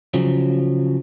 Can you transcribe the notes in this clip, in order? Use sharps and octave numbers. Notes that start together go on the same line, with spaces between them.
C#3 F3 F#3